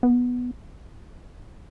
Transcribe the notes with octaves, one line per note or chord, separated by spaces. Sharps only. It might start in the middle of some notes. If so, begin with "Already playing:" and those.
B3